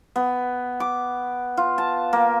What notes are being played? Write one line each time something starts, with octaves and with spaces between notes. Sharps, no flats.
B3
D6
F4
A5
A#3